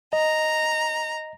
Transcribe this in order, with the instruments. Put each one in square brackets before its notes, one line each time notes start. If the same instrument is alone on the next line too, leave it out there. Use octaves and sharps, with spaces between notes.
[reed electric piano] D#5 [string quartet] A#5